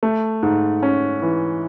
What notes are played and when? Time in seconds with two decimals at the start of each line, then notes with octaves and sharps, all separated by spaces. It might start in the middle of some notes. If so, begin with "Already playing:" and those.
0.03 A3
0.43 G#2
0.83 C#4
1.22 E3